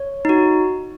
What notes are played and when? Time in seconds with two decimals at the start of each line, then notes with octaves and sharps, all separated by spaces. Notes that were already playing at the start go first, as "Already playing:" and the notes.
Already playing: C#5
0.25 D#4 F#4